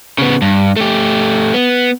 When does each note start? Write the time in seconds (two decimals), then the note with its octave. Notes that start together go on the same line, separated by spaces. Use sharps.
0.18 C#3 B3
0.42 G2
0.76 A3 G4
1.54 B3